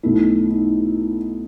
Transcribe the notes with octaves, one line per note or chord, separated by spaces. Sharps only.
B1 B2 A3 D#4 E4
D#4